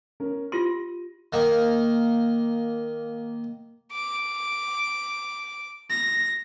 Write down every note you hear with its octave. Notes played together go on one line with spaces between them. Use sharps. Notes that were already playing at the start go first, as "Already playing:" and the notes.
C#4 A#4
F4 G4 C6 A#6 D#7
D#3 A#3
D6
A#6